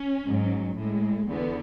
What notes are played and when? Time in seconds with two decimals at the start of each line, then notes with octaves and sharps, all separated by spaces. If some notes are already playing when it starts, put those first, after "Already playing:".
Already playing: C#4
0.25 G#2 F#3
0.77 A2 G#3
1.28 E2 D3 B3